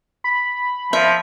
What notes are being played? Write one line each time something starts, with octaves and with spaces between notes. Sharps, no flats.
B5
F3 E5